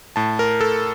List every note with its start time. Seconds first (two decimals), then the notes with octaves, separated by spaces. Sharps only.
0.16 A2 A5
0.39 A#4
0.61 A4